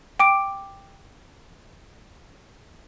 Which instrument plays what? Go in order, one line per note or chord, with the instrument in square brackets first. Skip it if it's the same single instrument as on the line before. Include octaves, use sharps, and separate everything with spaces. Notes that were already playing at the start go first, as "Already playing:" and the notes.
[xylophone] G5 D6 D7